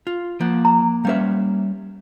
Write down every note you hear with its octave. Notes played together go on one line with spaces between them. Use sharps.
F4
F3 A#3 F#5
A#5
G3 C#4 B4 E5 F5